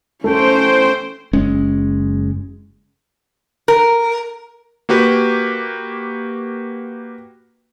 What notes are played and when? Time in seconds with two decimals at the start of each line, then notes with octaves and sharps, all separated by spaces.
0.24 A3 C#4 C5 G5
1.33 F#1 G#3 C#4
3.68 A#4
4.89 A#3 F#4 G4 B4